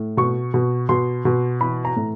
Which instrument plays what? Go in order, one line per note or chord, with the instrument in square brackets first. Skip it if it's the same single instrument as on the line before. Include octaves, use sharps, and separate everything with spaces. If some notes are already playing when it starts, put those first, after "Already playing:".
Already playing: [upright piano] A2
B2 C#6
B2
B2 C6
B2
E3 B5
A#5
A2